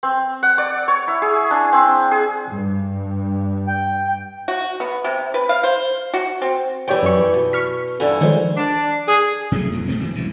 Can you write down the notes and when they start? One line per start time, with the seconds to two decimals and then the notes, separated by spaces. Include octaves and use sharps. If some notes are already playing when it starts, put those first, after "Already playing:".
0.03 C4
0.43 F#5
0.58 D5
0.88 C#5
1.08 E4
1.22 G#4
1.51 D4
1.73 C4
2.11 G#4
2.48 G2
3.68 G5
4.48 F#4
4.80 B3
5.04 C3
5.34 B4
5.49 F5
5.63 C5
6.14 F#4
6.42 C4
6.88 E3 G3 G4 C#5 G5
7.03 F#2 C#6
7.34 B2
7.53 C#6 F6 B6
8.00 G2 D3 E3
8.21 D#3 F3 G#3 C5 C#5
8.56 D4
9.07 G#4
9.52 C3 F#3 G3 A3
9.72 F2 A#2 E3
9.88 B2 A3 C4
10.01 D#3 E3 C4
10.15 C2 F#2 A#2 E3